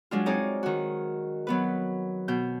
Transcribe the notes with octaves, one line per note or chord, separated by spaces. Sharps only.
F#3 G#3 D4 F4
C4 D#4 G#4 C#5 D5
D#3 F#4
F#3 B3 B4
B2 G6